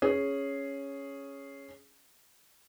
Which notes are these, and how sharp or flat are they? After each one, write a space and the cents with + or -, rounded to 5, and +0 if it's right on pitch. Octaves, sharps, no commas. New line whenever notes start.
C#4 +0 G#4 +0